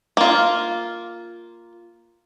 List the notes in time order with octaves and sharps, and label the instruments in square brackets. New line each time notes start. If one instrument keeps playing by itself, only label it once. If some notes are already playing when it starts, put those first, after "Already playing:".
[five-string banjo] A#3 F4